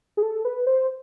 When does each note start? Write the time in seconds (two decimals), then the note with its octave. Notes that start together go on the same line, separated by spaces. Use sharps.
0.17 G#4
0.23 A4
0.45 B4
0.67 C5